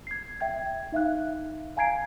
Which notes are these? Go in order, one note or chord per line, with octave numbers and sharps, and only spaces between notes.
G#6 C7
E5 G5 G#6
D#4 E5 F5 F#6
F5 G#5 A#5 G#6 C7 D7